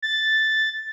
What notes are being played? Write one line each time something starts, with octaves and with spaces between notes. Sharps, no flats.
A6